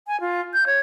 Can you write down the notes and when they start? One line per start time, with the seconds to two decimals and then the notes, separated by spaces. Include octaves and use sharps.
0.07 G#5
0.20 F4
0.54 G6
0.67 C#5